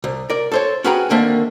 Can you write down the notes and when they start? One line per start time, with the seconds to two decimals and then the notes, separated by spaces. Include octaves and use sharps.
0.04 C2
0.30 A#4 D5
0.52 A4 C5 C#5
0.84 C#4 F#4 G#4 B4 G5 A#5
1.10 D3 D#3 A#3 C4 E5 A5